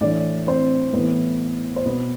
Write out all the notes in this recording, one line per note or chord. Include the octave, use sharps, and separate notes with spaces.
A2 E3 D4 D5
C4 C5
A2 E3 B3 B4
C5
B2 B3 B4